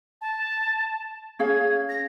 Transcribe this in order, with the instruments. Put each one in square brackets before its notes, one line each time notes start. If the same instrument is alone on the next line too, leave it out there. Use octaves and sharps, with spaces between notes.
[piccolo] A5
[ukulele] C#4 G#4 F5 [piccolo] G#6
[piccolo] A#6